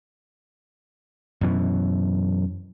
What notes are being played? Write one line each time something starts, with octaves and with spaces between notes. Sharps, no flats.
F#2 B2 E3